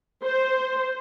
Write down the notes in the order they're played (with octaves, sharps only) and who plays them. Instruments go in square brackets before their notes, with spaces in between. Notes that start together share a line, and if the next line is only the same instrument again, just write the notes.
[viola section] C5